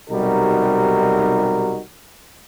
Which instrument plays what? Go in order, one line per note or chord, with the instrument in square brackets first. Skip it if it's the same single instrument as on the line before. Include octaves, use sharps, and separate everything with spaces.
[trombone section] B1 C3 G3 D#4 F#4 A#4